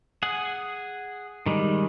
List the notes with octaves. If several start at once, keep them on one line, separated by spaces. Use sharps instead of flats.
G#4 F#5
D#3 G3 G#3